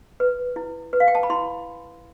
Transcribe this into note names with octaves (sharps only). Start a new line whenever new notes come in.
B4
E4
B4
F5
G5
A5
B5
E4 C6